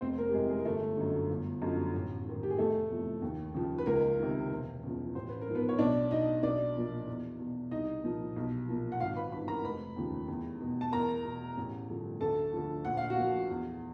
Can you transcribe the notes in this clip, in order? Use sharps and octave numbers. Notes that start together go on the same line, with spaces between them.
F1 C4 C5
A#3 A#4
G4
F2 C3 E3 G#3 G#4
G#3 G#4
A#4
G1 A3 A4
F#2 D3
G1
F#2 D3 F3
A1
G#2 D#3
G4
G#4
F1 A3 A4
E2 C3 F3
D#2
C#3 F3
B4
C#2 A#3 A#4
C3 D#3
E1
E2 C#3 F3
A1 C5
B4
A#4
G#2 F3
B3 B4
C#5
B1 D4 D5
B2 D#4 D#5
B1 D4 D5
A#2 F3
E2
B2
C2 D#4 D#5
A#2 F3
B1
A#2 F3
F#5
G#1 F4 F5
B4 B5
G2 E3 B4 B5
A#4 A#5
F1 B4 B5
D#2 C#3 F3
E2
B2
A5
E2 A#4 A#5
B2
A1
G2 D3 F3
D2 A4 A5
D3 F3
A#1 F#5
F5
F#4 F#5
A#2 F3
E2